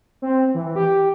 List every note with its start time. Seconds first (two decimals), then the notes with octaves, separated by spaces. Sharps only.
0.22 C4
0.54 E3
0.76 G4